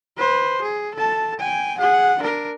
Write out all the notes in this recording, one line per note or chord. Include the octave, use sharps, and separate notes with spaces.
B4 C5
G#4
A4 A5
G5 G#5
G#4 F#5
D4 A#4